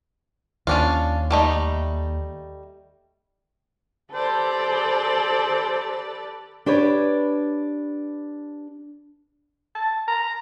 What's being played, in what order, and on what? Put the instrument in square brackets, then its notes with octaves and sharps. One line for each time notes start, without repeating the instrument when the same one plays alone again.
[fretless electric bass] D#2 [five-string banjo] C#4 D4 F4
[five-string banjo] G3 A3 D#4
[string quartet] G4 B4 D5 [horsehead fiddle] A4 [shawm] C5
[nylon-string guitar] D4 G4 B4 C#5
[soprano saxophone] A5
A#5